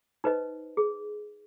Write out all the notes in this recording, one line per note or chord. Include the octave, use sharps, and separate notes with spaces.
D#4 B4 C5 D#5
G#4